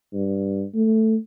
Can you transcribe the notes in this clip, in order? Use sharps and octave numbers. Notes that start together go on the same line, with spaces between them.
G2
A3